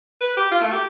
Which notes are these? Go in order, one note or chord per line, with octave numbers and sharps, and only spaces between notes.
B4
G4
F4
A3
G4